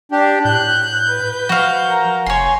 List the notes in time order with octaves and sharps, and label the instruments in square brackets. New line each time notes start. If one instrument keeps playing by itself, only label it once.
[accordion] D4 G4
[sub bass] A2 [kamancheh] F#6 [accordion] G6
[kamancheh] B4
[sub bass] F3 [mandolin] F#4 F5
[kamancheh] A#4 A#5
[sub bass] F1 [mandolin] C#5 C6 [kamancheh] G#5